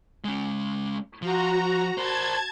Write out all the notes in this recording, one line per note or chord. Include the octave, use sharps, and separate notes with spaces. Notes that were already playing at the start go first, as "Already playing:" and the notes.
G#3 C#4
F3 F#4 A#5
A#4 C5 A5 G#6